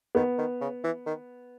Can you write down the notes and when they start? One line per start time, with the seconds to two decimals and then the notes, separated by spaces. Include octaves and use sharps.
0.15 D#3 B3
0.38 D#3
0.61 C#3
0.84 E3
1.06 D#3